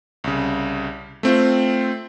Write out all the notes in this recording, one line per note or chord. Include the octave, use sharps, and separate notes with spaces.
C2 C#3
A3 C4 F4